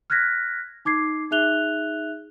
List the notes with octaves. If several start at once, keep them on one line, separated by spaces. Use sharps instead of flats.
F6 F#6 G#6 A#6 B6
D#4 D6 G#6 C7
D#4 G#4 E5 F#6 F7 G7